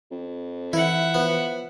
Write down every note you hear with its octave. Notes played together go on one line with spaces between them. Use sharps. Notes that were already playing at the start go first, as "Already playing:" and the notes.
F2
E3 E4 E5 F#5
F3 B3